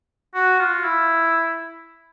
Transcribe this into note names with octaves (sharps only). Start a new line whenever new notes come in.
F#4
F4
E4